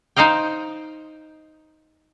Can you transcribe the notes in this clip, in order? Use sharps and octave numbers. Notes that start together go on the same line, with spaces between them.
D#4 C5 D#5 F5 G5